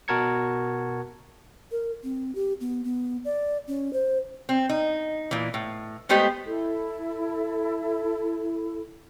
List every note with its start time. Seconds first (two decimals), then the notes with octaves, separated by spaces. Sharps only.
0.08 B2 F#4 A#4 A5 G#6 C#7
1.71 A#4
2.04 C4
2.35 G4
2.60 B3
2.84 B3
3.25 D5
3.68 C#4
3.93 C5
4.49 C4
4.69 D#4
5.31 A#2 E3
5.54 A2
6.09 G#3 A3 B3 G4 C5 D#5
6.46 E4 A4